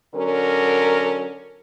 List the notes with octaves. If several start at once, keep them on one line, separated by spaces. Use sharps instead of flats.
D3 F#3 C#4 A#4